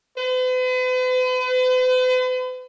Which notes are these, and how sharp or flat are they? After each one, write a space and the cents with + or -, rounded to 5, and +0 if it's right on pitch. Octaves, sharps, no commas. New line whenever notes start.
B4 +45